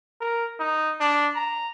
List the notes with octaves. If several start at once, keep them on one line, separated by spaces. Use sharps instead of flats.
A#4
D#4
D4
A#5